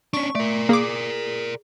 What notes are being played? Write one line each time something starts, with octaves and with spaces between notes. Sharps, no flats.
C#4 D4 C#6
A3 A#4 D5
A#3 G#4 D6